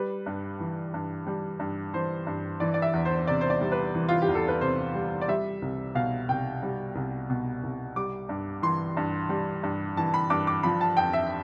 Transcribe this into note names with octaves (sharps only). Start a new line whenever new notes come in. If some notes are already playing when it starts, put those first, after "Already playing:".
Already playing: G3 B4
G2
E3
G2
G3
G2
E3 C5
G2
E3 D5
D5
E5
E2
C5
C3 D5
C5
D5
G3
B4
E3
F4
G4
E2
A4
B4
C3 C5
G3
D5
G3 E5
C2
B2 F5
C2 G5
G3
C2
B2
C2
G3 D6
G2
E3 C6
G2
G3
G2
E3 A5
B5
G2 D6
D6
F3 B5
A5
F2 G5
E5